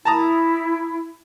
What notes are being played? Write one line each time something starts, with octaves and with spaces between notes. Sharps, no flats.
E4 A5 A#5 D#6